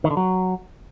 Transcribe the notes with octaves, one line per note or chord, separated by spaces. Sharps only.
D#3
D3
F#3